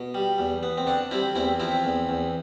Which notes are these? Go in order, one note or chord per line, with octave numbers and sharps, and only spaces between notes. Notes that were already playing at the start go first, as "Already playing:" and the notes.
Already playing: B2
G3
E2
B3
C4
D3 D4
G3 C4 E4
E2 C4 E4
F3 C4 E4
E2
E2